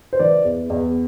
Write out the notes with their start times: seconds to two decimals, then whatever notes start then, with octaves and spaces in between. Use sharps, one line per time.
0.13 C5
0.19 E3 D5
0.45 E2
0.70 E2